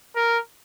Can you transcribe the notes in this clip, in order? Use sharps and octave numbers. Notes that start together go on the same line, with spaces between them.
A#4